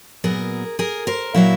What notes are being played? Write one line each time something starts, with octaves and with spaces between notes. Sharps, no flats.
A#2 F#3 B3 G#4 A#4
G#4 A#4
A#4 C5
A#2 F#3 A#3 E4 F#4